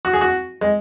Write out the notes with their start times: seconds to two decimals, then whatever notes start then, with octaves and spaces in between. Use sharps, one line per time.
0.05 F#4
0.13 G#4
0.21 F#4
0.61 G#3